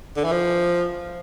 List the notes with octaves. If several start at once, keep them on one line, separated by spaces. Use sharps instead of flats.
D3
E3
F3